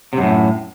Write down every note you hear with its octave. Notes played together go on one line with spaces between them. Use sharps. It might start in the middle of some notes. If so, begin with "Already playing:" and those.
F#2 A2 C3